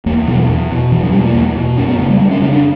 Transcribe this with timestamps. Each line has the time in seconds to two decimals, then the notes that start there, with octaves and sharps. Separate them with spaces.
0.06 E2 A#3
0.27 B2 F#3
0.38 E3
0.49 E2
0.71 B2
0.92 E2 E3
1.02 F#3
1.12 B2 G3
1.24 A#3
1.34 E2
1.56 B2
1.77 F#2 C#4
1.88 B3
1.99 C#3 A#3
2.10 G3
2.20 F#2 G3
2.31 C#4
2.42 C#3 C#4
2.53 D4